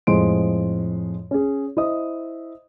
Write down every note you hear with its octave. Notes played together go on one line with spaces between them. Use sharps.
F2 A2 G#3 C5 C6 D7
C#4 G#4
E4 C5 D#5 D#6